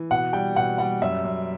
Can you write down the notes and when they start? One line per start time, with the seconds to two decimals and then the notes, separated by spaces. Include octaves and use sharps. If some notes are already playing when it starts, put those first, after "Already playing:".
Already playing: E3
0.11 B2 F#5
0.33 G3 G5
0.56 B2 F#5
0.78 G3 F#5
1.02 F#2 E5
1.24 F#2